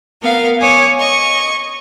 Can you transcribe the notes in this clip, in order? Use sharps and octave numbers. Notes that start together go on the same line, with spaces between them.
B3 A#4 F5
C#5 G#5 D6 D#6
D#5 C#6